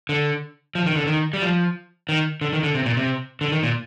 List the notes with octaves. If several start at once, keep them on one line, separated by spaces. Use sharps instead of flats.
D3
F3
D#3
D3
D#3
G3
F3
D#3
D3
D#3
D3
C3
A#2
C3
D3
D#3
A#2